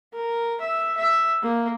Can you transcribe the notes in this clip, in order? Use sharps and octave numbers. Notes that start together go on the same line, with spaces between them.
A#4
E5
E5
A#3